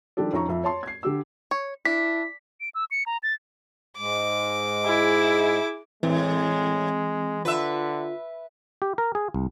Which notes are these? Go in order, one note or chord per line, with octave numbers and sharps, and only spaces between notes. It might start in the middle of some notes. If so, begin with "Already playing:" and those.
D#3 F3 G3 D4 G4 A4
F2 C#4 D#4 A#5 C#6
F2 E5
C#5 A5 C6
G#6 C7
D3 G4 E6
C#5
D4 E4 B6
D7
E6
C#7
A#5
A6
G#2 G#3 D6
E4 G#4
A2 E3 G#3 C4
D3 F4 B4 E5
G4
A#4
G#4
C2